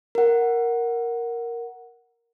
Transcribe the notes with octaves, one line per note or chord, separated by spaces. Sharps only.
A#4 F#5